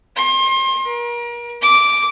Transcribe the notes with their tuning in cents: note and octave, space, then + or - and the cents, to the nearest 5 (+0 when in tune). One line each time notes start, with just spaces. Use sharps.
C6 +30
A#4 +35
D6 -5